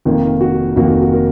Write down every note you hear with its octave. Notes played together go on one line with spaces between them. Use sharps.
F1 F2 D#3 A#3 F4
F#4
F1 F2 D#3 A#3 F#4
F#4
A#4